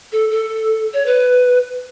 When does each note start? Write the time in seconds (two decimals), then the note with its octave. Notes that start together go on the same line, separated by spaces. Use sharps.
0.12 A4
0.30 A4
0.94 C#5
1.06 B4